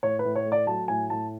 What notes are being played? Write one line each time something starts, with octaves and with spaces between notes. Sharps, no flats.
A2 C#5
B4
A2
C#5
A3
D5
F#3 A5
A2 G#5
A2 A5